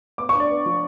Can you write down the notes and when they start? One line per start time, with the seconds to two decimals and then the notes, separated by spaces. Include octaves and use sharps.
0.18 B3 D6
0.29 C#6
0.35 D4 D5
0.50 B3
0.66 F3